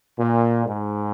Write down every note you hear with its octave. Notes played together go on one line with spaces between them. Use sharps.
A#2
G#2